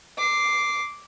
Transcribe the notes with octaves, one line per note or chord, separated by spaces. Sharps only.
D6 C7